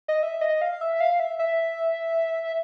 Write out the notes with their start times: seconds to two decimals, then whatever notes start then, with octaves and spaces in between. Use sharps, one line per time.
0.08 D#5
0.23 E5
0.41 D#5
0.61 F5
0.81 E5
1.01 F5
1.20 E5
1.39 E5